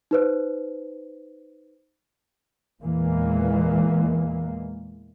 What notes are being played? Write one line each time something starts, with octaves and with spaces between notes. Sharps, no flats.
D#4 B4 C5
E2 A#2 E3 G#3 A#3